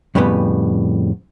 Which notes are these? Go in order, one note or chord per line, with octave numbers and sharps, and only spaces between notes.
F2 A2 C#3 G3 B3